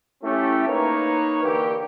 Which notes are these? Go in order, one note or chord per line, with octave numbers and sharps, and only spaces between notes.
A3 C#4 E4 G4
A#3 D#4 B4 C#5
D3 E3 A#3 G4